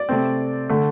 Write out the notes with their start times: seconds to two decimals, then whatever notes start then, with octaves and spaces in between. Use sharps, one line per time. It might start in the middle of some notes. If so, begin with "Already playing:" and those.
Already playing: D5
0.09 C3 A3 C4
0.69 D3 A3